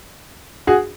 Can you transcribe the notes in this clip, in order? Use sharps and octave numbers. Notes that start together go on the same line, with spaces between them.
F#4 G#4